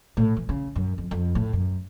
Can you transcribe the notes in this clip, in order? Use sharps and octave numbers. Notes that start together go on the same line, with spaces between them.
A2
E3
C#3
F#2
F2
F2
A2
F#2